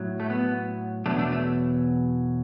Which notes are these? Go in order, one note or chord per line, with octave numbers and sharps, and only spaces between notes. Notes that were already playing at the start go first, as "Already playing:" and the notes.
Already playing: A2 F#3
A3
B3
E2 B2 F#3 A3 D4
A3 D4
A3